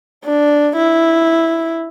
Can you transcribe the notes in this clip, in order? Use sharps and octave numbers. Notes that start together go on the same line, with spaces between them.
D4
E4